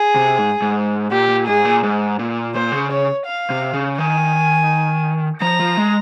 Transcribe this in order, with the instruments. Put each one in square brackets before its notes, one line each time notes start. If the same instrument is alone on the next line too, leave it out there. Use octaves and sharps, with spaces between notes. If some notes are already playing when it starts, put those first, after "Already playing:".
Already playing: [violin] G#4
[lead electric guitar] C3
G#2
G#2
[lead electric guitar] A#2 [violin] G4
[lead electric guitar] A#2
[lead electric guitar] G#2 [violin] G#4
[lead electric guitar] A#2
G#2
A#2
[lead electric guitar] A#2 [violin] C5
[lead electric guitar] C#3
[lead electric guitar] C#3 [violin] C#5
[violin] F5
[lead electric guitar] C3
C#3
[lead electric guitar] D#3 [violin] G#5
[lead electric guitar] F3 [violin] A#5
[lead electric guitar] F3
G#3